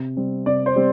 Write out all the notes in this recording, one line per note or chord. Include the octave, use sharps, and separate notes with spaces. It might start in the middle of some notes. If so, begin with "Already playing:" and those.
Already playing: C3
G3 C4
C3 D5
C5
G3 C4